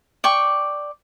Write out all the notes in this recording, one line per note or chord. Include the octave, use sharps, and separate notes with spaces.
D5 G5 C#6